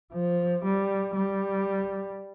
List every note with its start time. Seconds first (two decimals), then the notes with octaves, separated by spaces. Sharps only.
0.13 F3
0.65 G3
1.16 G3